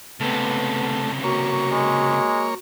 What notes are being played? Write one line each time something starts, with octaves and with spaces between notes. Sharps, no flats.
C#2 C3 A3 B3
A#3 F#4 C#5
G#3